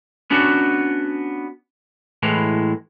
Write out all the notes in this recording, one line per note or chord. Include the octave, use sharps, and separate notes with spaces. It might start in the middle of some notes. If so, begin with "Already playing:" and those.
B3 C#4 D4 F#4
A2 E3 G#3